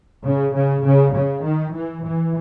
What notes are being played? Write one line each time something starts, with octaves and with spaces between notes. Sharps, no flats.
C#3
C#3
C#3
C#3
D#3
E3
E3